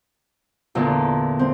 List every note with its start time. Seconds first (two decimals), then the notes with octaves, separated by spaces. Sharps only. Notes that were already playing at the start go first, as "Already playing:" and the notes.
0.75 E2 A#2 D3
1.39 C4